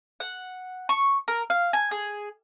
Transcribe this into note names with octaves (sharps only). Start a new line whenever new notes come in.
F#5
C#6
A#4
F5
G#5
G#4